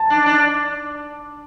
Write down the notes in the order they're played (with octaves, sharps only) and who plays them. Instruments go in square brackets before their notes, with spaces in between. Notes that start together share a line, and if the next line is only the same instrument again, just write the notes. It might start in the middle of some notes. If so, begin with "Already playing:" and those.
Already playing: [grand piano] A5
[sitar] D4
D4